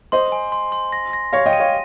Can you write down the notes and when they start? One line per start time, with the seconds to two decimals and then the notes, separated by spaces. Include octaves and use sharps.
0.12 C5 D#5 C6
0.32 G#5
0.52 C6
0.72 C6
0.92 A#6
1.13 A#6
1.33 C#5 F5 A#6
1.46 D#5 G5
1.53 D#7
1.60 C#5 F5